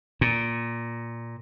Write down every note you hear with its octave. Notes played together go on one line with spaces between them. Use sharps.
A#2